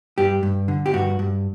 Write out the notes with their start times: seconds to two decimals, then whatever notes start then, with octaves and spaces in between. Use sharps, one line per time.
0.18 G2 G4
0.43 G2
0.68 D3
0.86 G4
0.94 G2 F#4
1.19 G2